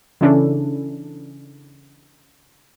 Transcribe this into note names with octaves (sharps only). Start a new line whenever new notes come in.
C#3 E3 C#4 D4 E4 A4